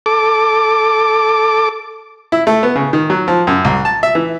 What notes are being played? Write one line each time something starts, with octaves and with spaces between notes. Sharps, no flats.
A4 D6
E4
A3
B3
C#3
D#3
F#3
F3
F#2
C2
A5
E5
E3